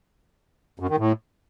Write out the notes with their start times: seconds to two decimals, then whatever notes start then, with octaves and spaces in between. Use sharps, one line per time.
0.80 F#2
0.89 D#3
0.98 A2